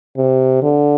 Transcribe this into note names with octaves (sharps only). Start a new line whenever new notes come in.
C3
D3